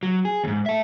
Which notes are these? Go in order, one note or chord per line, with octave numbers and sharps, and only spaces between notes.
F#3
G#4
D#2 G#2
E5 A5